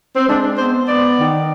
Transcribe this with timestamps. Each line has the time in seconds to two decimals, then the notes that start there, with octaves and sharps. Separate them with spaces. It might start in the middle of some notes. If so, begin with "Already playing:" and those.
0.16 C4
0.28 G#3 D4
0.58 B3 C5
0.88 B3 D5
1.18 D#3